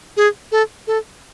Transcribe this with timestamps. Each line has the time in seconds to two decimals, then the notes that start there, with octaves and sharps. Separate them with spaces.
0.17 G#4
0.52 A4
0.87 A4